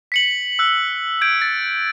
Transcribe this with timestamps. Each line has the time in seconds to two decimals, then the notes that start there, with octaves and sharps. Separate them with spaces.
0.12 B6 C#7 F#7
0.59 E6 F#6
1.21 G6 G#6 D7
1.42 A6